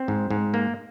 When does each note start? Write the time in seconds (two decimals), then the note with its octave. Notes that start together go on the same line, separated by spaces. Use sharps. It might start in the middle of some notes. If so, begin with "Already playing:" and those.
Already playing: C4
0.08 G#2
0.31 G#2
0.54 A#3